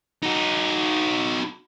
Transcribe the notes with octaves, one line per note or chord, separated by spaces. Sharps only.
D#4 F#4